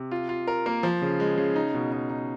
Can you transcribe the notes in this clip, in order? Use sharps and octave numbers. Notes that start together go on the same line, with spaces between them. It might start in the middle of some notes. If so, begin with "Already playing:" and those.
Already playing: C3
F4
F4
A#4
A#3
F3
C#3
G#3
C#3
D#4
B2
D#4
D#4